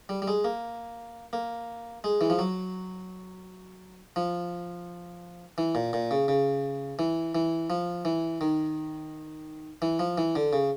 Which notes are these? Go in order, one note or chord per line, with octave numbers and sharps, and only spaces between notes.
G3
G3
G#3
A#3
A#3
G#3
E3
F3
F#3
F3
E3
A#2
A#2
C#3
C#3
E3
E3
F3
E3
D#3
E3
F3
E3
D3
C#3